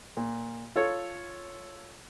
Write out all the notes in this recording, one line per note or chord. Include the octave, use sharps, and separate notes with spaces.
A#2
F4 A4 C#5